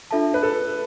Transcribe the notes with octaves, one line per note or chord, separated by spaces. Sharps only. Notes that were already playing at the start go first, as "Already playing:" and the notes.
D4 F4 A4 E5 A5
B4
A4